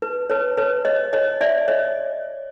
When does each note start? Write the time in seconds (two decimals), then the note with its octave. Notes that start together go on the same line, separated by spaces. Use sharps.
0.02 B4
0.30 B4 C#5
0.57 B4 C#5
0.85 C#5 D#5
1.13 C#5 D#5
1.41 D5 E5
1.68 C#5 D#5